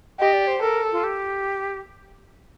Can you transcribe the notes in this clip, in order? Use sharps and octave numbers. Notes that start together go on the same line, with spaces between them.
G4 D#5
D5
C5
A4 A#4
F4
G4